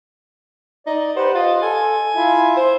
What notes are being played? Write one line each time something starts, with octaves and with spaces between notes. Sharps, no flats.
D#4 D5
G4 B4 C5 F#5
F4 D#5
A4 G#5
E4 F4 E5
C5